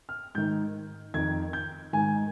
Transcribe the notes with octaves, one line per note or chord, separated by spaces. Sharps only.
F6
G#2 D#3 G6
F2 D#3 G#6
G6
G#2 D#3 G#5